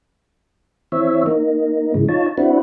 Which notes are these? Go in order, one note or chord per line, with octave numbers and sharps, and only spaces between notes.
E3 C4 C#5 E5
A#3 D#4
G#2 C#3 E3 G#3
D#4 F4 C#5 A5
C4 D4 E4 F#4 B4